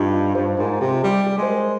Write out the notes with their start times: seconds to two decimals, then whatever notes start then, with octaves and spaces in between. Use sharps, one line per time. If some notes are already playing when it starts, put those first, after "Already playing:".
Already playing: G2 D4 D#4 F4
0.13 F4
0.35 G2 C5
0.57 G#2 A#4
0.81 C3 G#4
0.93 F4
1.03 G3 G4
1.26 G#4
1.38 G#3 C5
1.49 A#4